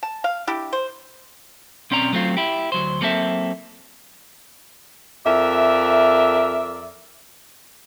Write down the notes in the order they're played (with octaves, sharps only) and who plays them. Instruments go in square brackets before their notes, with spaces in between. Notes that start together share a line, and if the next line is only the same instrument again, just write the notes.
[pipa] A5
F5
D4 E4 G4
C5
[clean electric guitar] B1 C4 C#4 D5 A#5
F#3 A3 C4 F4
E4 G4
D2 F#3 C5
F#3 A#3 C4 A4 E5
[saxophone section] F2 A#4 D5 E5